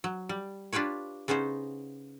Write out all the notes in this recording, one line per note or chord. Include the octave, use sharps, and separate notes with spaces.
F#3
G3
D4 F4 G4 B4 C#5
C#3 B3 C#4 D#4 C5